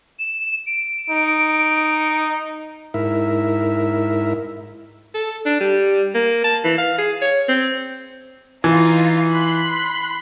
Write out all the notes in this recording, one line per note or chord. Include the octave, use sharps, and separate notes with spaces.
E7
D7
D#4
G#2 E4 A#4 E5
A4
D4
G3
A#3
A5
E3
F5
G#4
C#5
C4
E3 D#4 F4
B5 C6 F#6